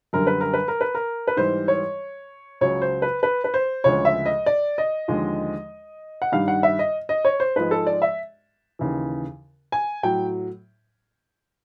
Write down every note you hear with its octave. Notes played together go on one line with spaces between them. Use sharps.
F#2 D3 G3 A#4
B4
A#4
B4
A#4
B4
A#4
B4
G#2 E3 G3 C5
C#5
C#2 C#3 F#3 C#5
C5
B4
B4
B4
C5
D2 C#3 F3 G#3 C#5
E5
D#5
D5
D#5
D#2 D3 F3 G#3
F#5
G2 D#3 G3 F5
F#5
E5
D#5
D#5
C#5
C5
G#2 F3 G#3 B4
A4
D5
E5
D#2 C#3 E3
G#5
A2 F#3 G5